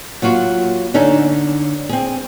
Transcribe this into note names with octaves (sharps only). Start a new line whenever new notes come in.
F#3 A#3 F4 F#4
D3 C#4 D#4 A4
C4 G#4